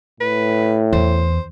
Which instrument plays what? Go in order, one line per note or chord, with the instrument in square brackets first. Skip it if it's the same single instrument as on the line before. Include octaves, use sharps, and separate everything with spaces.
[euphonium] A2 [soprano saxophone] B4
[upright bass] E2 [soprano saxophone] C5